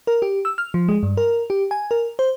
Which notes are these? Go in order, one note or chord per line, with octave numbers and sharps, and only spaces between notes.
A#4
G4
E6
F6
F3
G#3
G2
A#4
G4
G#5
A#4
C5